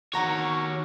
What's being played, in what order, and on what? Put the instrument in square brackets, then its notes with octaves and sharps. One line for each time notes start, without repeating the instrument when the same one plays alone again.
[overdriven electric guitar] D#3 C#5 [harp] F#4 A#5